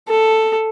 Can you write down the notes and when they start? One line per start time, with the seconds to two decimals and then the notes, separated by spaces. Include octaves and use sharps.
0.08 A4